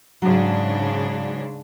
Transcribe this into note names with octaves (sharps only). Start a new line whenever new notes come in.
G#2 C#3 F#3 D4